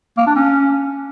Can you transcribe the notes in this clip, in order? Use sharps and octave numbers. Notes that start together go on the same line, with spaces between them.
A#3
D4
C#4